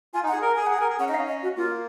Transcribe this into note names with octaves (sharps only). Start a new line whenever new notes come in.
F4 G#5
D#4
F#5
G#4
A#4
G#4 G#5
G#4 F#5
A#4 G#5
G#4
C#4 F#5
D#4 D#5
F5
C#4
D#5
F#4
A#3 F4